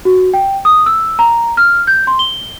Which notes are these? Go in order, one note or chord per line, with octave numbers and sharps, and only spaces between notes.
F#4
G5
D#6
E6
A#5
F6
G6
C6
G7